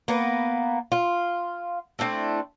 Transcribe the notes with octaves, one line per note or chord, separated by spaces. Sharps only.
A#3 B3
F4
A3 C4 D4 E4